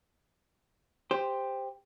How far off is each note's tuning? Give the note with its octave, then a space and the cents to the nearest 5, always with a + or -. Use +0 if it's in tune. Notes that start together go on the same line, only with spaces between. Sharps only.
G4 +15 C5 -5